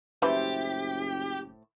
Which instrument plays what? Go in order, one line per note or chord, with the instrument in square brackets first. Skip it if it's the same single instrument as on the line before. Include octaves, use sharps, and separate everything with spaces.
[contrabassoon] F#1 [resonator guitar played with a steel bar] A2 C5 E5 [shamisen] E3 G3 B4 [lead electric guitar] G4